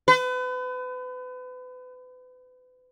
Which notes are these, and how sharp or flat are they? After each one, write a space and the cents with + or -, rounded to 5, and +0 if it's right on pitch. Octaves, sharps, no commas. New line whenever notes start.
B4 +35